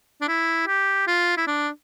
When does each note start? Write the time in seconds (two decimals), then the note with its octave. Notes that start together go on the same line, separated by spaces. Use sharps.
0.21 D4
0.28 E4
0.67 G4
1.07 F4
1.37 E4
1.47 D4